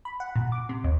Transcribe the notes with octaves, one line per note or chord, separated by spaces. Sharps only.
B5
F#5
A#2
D6
C3
D#2